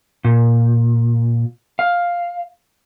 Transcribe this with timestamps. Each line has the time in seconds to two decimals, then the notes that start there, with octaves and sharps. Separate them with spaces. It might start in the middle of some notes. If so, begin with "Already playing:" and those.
0.24 A#2
1.79 F5